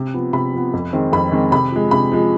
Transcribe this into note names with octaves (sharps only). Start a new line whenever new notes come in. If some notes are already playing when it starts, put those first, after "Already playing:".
Already playing: C3
F3 B3
C3 B5
F3 B3
F2
D#3 G#3 C4
F2 B5
D#3 G#3 C4
C3 B5
F3 G#3
C3 B5
F3 G#3